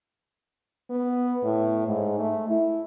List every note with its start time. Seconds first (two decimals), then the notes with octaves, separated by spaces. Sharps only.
0.90 B3
1.44 A2
1.87 G#2
2.19 A3
2.49 E4